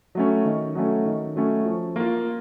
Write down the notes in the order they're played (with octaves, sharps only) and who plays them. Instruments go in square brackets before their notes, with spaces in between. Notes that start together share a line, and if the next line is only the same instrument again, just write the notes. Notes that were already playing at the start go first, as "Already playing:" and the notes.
[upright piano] F#3 A3 C#4
D#3
F#3 A3 C#4
D#3
F#3 A3 C#4
F3
A#3 F4